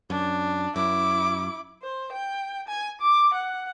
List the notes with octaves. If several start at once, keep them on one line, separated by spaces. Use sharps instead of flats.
F#2 D4
F#2 E4 D6
C5
G5
G#5
D6
F#5